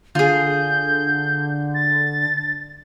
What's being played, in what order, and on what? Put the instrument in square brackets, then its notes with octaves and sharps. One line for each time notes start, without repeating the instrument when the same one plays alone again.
[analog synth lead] D3 [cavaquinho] F4 G#4 [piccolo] G6
[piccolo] A6